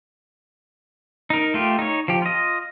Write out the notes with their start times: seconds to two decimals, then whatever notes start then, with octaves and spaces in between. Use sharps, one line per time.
1.30 D#4 A#4
1.54 A3 F4 G4
1.79 D#4 C#5
2.08 F3 G4
2.22 F4 D#5